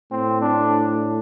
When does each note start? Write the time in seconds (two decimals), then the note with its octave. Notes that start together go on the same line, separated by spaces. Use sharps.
0.11 A2 C4
0.41 D4